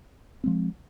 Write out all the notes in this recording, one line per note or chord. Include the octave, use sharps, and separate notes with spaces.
F3 G#3 C4